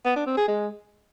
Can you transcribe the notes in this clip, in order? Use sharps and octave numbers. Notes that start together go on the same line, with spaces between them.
B3
D4
C4
G#4
G#3